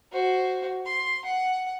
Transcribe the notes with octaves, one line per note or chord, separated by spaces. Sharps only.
F#4 C5
C6
F#5